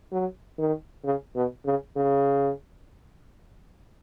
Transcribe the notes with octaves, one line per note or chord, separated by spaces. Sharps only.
F#3
D#3
C#3
B2
C#3
C#3